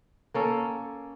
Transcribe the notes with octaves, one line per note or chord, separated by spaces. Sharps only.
A#3 C#4 A4